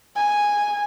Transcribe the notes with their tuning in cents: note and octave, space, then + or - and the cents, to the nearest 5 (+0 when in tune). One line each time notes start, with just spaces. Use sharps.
G#5 -5